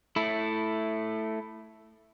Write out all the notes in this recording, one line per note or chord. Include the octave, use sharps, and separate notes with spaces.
A3 E4